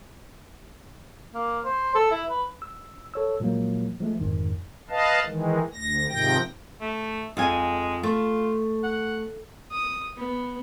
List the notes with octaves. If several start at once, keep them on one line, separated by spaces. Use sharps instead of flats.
A#3
C5
A4
E4
B4
E6
A4 C#5 E6
A#2 F3 F#3 G#3 A#3
F3 G#3 A3
G1 F2 G#2 D#3
B4 D#5 F5 A5
D#3 E3 G#3
D2 A#6
G#2 C3 D#3 F3 G5 A#6
A3
F2 G#3 F5 G#5
A3 F4
F#5
D#6
B3